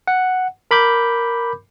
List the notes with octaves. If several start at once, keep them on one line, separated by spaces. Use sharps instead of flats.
F#5
A#4 B5 D6 G6